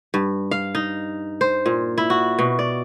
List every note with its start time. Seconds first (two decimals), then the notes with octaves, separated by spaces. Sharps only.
0.14 G2
0.51 F5
0.75 D#4
1.41 C5
1.66 A#2
1.98 E4
2.10 F#4
2.39 B2
2.59 D5